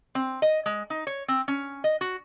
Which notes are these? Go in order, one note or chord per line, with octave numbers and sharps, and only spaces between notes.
C4
D#5
G#3
D#4
C#5
C4
C#4
D#5
F#4